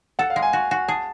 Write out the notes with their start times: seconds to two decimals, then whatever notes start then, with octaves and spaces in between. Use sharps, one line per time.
0.19 A4 F#5
0.30 F5
0.36 G#3
0.42 G#5
0.53 F#4
0.71 F#4
0.88 G#4 A5